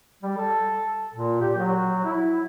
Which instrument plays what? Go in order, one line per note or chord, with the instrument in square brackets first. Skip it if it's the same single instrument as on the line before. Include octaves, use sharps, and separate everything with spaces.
[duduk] G3
A4
A#2
G4
F#3
E4